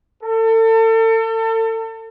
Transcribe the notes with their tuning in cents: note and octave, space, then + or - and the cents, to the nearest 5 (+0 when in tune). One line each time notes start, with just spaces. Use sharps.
A4 +35